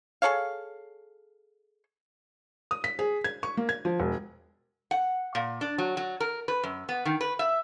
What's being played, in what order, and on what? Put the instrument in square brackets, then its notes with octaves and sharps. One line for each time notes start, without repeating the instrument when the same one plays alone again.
[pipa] G#4 A4 C#5 F5
[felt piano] D#6
B6
G#4
G#6
C#6
A#3
G#6
F3
E1
[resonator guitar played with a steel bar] F#5
A#2
D4
F#3
F#3
A#4
B4
F#2
B3
D#3
B4
E5